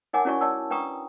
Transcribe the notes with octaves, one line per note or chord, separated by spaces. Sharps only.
D#4 A#4 C#5 F#5 G#5 D6
C#4 E4 F#4 C#5 D5 C#6
C#5 D5 A5 C6 E6
D4 B4 G5 A#5 C#6 D#6